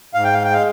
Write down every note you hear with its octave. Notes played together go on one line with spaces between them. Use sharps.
G#2 F5
G5
F5
G5
G#3 F5